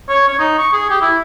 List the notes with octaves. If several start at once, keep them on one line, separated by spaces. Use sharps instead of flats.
C#5
C#5
D#4
C#6
G#4
G4
E4